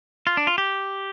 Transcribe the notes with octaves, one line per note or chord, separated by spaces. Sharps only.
F4
D4
F4
G4